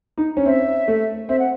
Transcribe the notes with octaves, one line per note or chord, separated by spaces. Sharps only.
D#4
C#4
C4 E5
A3
C4 E5
F#5